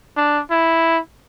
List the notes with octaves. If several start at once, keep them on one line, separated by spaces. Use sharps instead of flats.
D4
E4